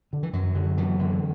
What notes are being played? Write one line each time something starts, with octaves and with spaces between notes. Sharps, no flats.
D3
E3
F#2 F#3
D3
F#2 E3
D3